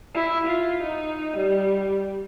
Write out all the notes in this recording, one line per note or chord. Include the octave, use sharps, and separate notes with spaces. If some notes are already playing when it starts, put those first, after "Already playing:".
E4
F4
D#4
G3